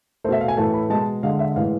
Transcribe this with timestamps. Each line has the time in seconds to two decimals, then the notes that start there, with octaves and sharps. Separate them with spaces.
0.24 A3 C5
0.29 B2 E5
0.41 F5
0.48 G#5
0.57 A2 E3 A3 A5
0.74 B5
0.90 B2 G#3 A5
1.23 D3 G#3 F5
1.39 E5
1.56 A2 E3 G#3 F5